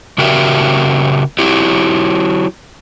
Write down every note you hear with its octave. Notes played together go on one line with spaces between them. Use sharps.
C#3 F#4 G4 A#4 D#5 E5
F#3 E4 G4